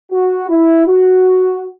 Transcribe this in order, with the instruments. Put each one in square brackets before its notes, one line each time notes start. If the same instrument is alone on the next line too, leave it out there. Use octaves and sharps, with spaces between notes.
[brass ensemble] F#4
E4
F#4